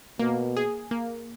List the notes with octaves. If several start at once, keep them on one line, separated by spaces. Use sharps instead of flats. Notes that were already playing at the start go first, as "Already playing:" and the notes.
B2 A#3
G#4
A#3